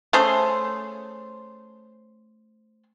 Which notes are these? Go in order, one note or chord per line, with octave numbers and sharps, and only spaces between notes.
A3 C#4 G#4 C5